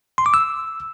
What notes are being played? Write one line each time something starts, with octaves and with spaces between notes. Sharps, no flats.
C6
D6
E6